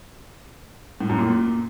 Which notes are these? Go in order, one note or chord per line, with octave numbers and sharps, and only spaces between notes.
A2
F#2
A#2